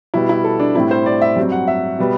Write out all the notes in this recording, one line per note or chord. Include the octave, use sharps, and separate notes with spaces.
B2 G3 B3 E4
E4
A4
D4
A2 G3 C4 E4
C5
D5
E5
G2 F#3 C4
F#5
E5
B2 G3 B3